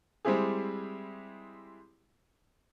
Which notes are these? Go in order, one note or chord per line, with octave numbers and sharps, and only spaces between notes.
G3 G#3 C4 E4 G4 G#4